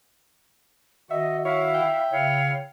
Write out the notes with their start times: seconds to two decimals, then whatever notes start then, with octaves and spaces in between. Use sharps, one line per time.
1.11 D#3 F#4 D#5 E5 F#5
1.45 E4 C#5 E5 F5
1.74 G5
2.12 C#3 E4 C#5 F5